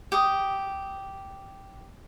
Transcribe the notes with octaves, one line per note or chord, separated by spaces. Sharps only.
G4 D#6